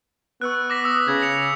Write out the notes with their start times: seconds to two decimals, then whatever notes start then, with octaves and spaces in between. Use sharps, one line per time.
0.41 B3 C#6 E6 F#6
0.70 D6 A#6 B6
0.84 D#6 E6
1.08 C#3 G#6
1.22 C#7 F7